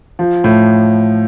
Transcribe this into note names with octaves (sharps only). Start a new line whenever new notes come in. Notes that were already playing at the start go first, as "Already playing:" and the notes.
F3
A2